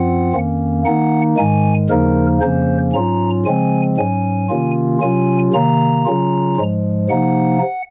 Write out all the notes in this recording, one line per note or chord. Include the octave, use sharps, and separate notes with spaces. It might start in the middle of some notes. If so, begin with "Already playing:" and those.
Already playing: F#2 F3 C4 F4 F#5
F2 D#3 A#3 C#4
D#3 A#3 D#4 F#5
G#2 D#3 G#3 G#5
D#2 C#3 F3 A#3 D#4 A#4
F2 C#3 F3 A#3 C#4 C5
G#2 F#3 C#4 F4 A#5
C#3 F3 G#3 C4 G#5
G#2 F#3 C#4 G#5
C3 D#3 A#3 C#4 F4
C3 F#3 C#4 F4 G#5
C3 D#3 A#3 A#5
C#3 F#3 C#4 F4
G#2 F3 G#3
C3 F3 A#3 D#4 F#5